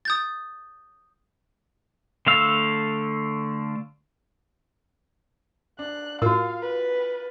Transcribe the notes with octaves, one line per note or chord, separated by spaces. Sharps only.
D#6 G6 A6
D3 A3 F5 E6
D4 F#6
A2 F4 F#4 A#4 F5
B4